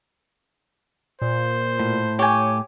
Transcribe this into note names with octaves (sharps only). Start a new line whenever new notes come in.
A#2 C5
A2
G4 C#5 G#5